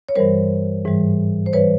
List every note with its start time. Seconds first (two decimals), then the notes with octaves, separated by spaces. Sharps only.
0.09 C#5
0.16 G2 E3 G3 A#4 C5
0.85 G#2 E3 G3
1.46 C5
1.53 E3 G3 B4 C#5